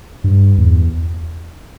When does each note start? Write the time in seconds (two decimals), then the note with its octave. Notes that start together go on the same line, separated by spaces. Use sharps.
0.24 G2
0.58 E2